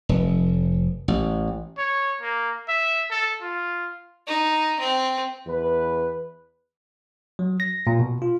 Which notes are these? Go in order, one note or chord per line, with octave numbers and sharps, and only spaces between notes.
F1
A1
C#5
A#3
E5
A4
F4
D#4
C4
E2 E3 B4
F#3
A#6
A#2
B2
F4